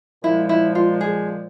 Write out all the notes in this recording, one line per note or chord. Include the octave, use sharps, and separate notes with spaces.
A#2 F3 G#3 E4
E4
F4
G#4